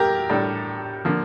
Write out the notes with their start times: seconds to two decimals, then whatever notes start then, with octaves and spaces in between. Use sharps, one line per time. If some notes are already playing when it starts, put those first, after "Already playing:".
Already playing: E2 A3 G4 A#4
0.29 A2 G3 D4 A4
1.05 D3 F3 A#3